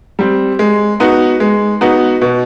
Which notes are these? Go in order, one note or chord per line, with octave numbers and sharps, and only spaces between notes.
G3 C4
G#3
B3 D#4 F#4
G#3
B3 D#4 F#4
B2